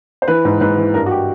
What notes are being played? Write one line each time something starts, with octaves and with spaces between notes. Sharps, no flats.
C5
E3 B4
G#2
G#2 B4
E3
G2 A#4
F#4
G4